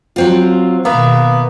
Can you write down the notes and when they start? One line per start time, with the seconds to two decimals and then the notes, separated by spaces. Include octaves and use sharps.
0.16 F#3 C4 F4
0.85 B2 D#3 A#3 B3 E5 A#5